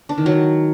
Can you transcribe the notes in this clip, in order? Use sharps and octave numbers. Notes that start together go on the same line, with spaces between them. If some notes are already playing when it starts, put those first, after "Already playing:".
D4
D#3
F#3